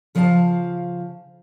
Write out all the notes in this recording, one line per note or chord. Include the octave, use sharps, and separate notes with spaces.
C#3 F3 B4 D#5 F5 A5